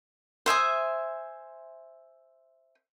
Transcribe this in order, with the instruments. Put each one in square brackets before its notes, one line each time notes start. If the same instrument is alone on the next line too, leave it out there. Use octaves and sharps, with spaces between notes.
[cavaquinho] C5 E5 G#5 D#6